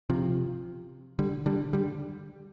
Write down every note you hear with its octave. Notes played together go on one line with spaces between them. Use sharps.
C3 F3
D3 G3
D3 G3
D3 G3